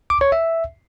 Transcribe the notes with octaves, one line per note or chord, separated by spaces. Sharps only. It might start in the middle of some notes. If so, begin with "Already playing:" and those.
D6
C#5
E5